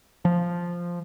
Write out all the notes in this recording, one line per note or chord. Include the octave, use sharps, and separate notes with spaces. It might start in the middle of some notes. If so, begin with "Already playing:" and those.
F3